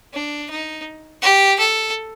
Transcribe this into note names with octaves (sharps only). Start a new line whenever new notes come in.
D4
D#4
G4
A4